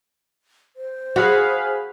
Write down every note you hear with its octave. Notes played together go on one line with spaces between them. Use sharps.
C5
F#4 G#4 F5 B5